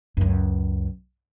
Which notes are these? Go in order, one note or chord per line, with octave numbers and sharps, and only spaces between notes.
C#2 F#2